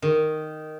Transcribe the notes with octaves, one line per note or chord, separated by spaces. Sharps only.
D#3